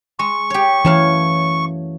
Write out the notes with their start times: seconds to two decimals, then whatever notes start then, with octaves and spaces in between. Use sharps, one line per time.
0.19 G#3 C#6
0.50 G4 C#5
0.85 F#2 E3 A3 C#5 F5